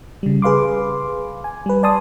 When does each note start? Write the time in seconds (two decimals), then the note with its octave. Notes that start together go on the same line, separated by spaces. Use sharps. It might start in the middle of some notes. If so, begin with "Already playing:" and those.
0.23 C#3 G3
0.42 G#4 B4 F5 C6 D6
1.44 G#5
1.66 G3 B4
1.83 D5 G#5 A5 C6 D#6